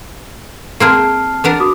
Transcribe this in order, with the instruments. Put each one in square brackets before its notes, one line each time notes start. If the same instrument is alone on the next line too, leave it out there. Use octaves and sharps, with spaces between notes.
[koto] A#3 C4 G#4 [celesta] A5 F6 C7
[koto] B3 D4 A#4
[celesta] F#4 D6 D#6